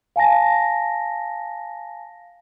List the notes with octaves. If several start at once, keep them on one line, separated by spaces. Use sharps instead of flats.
F5 G#5 A5 A#6